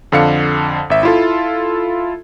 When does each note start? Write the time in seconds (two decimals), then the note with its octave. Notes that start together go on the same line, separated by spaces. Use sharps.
0.12 F2 D3 F5 C#7
0.90 G#1 E5
1.03 E4 F4 A4